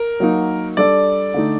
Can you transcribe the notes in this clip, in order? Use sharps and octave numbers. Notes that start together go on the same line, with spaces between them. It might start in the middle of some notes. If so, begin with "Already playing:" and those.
Already playing: A#4
F#3 A#3 D#4 F#4
G3 D4 A4 D5
D3 A3 D#4